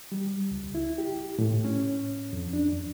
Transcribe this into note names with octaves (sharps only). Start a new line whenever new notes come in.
G3
C#2
E4
G4
A2
C#4
F2
D4
F2